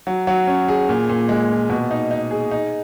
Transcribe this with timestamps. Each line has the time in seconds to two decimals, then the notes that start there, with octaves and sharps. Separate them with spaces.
0.07 F#3
0.27 F#3
0.47 C#4
0.68 G#4
0.89 A#2
1.09 A#2
1.29 G#3
1.50 A#2
1.69 B2
1.91 D#4
2.11 D#4
2.31 G#4
2.51 D#4